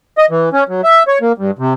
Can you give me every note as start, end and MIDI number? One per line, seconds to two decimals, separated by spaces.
0.18 0.26 75
0.31 0.49 52
0.53 0.64 61
0.69 0.81 54
0.84 1.03 76
1.08 1.18 73
1.22 1.32 58
1.38 1.51 43
1.59 1.74 48